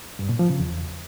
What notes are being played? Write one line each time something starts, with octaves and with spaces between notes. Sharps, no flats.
G2
A#2
F3
C#3
E2